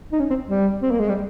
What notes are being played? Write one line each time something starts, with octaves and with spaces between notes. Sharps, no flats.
D#4
C#4
C4
G3
C4
A#3
G#3
G3